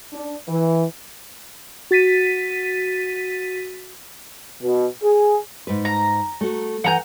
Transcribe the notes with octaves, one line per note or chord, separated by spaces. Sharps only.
D4
E3
F#4 A6 B6 D#7
B2
G#4
G#2 B4
A#5
A3 F#4
E3 F#5 G#5 A#5 G6